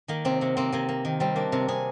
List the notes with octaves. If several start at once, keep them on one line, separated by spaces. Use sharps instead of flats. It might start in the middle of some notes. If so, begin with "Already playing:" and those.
D#3 A#3
C3 C4
C3 A#3
A#3 C4
C3 A#3
A#3
D#3
G3 C4
A#3 D4
C3 A#4
C3 G#4